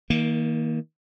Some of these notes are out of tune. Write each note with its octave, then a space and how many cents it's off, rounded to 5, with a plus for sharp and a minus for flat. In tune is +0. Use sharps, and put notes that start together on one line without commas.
D#3 +35 A#3 +0